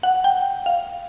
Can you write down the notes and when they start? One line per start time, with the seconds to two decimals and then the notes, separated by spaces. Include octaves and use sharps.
0.03 F#5
0.24 G5
0.66 F5